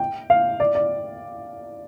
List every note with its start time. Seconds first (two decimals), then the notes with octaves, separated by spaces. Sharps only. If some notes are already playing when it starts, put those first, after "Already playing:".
Already playing: G5
0.30 F5
0.60 D5
0.75 D5